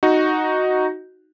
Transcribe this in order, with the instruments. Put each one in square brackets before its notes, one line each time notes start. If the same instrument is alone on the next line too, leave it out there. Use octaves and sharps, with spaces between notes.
[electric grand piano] D#4 F#4